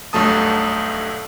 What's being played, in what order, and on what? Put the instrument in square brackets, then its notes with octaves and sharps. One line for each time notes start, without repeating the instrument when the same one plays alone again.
[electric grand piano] B1 G2 F#3 A3 A5 D#6